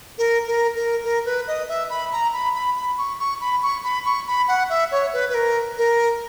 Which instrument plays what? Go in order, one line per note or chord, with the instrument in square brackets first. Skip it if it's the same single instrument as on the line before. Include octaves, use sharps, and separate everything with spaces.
[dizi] A#4
A#4
A#4
A#4
B4
D#5
E5
B5
A#5
B5
B5
B5
C#6
C#6
B5
C#6
B5
C#6
B5
F#5
E5
C#5
B4
B4
A#4
A#4